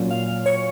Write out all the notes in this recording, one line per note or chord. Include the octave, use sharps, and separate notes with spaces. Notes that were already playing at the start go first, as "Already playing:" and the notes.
Already playing: A#2 F#3 C#4 F4
F5
C#5